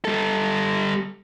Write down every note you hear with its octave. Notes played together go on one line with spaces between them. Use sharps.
G3 A4